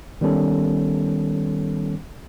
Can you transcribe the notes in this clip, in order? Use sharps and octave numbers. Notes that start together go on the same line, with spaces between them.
D#3 G3 B3 C#4 A4